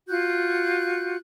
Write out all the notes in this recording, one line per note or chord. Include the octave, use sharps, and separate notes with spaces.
F4 F#4 F#6 G6